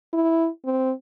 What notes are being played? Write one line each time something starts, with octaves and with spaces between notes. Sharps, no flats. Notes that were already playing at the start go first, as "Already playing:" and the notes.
E4
C4